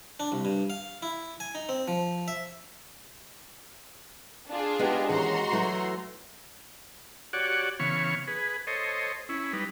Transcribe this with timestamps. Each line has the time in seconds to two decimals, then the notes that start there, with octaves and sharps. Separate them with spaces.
0.20 D4
0.32 C2
0.45 G2
0.70 F5
1.02 E4
1.40 G#5
1.55 D#4
1.69 C4
1.88 F3
2.28 E5
4.49 D4 F4 G#4
4.79 G#3 B3 D#4 G4 F#5
5.09 D#2 E3 C#4 F#4 A#5 C6
5.52 E3 F#3 A3
7.33 F#4 G4 C#5 D5 F#5
7.80 C#3 E3 B3 C#5 F5 C#6
8.27 G#4 B4
8.67 A4 C5 C#5 D#5
9.29 C#4 E4
9.53 G3 D#4 B4